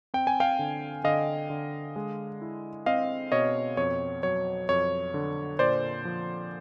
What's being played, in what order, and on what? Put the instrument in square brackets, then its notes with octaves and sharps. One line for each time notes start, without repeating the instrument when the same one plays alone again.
[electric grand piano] C4 G5
G#5
F5 G5
D3
D3 D#5 F5
D3
G#3
E4
C4 D#5 F5
B2 C#5 D#5
F2 C#5
F#3 C#5
F2 C#5
D3
A#2 C5 D5
F3